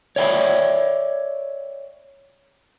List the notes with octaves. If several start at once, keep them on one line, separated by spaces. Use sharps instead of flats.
C#5 D5 E5 G5 A5 B5